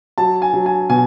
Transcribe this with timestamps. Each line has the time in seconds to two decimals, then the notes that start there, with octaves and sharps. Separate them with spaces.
0.18 F#3 A5
0.42 G#5
0.53 F#3
0.66 G#5
0.89 B2 G#5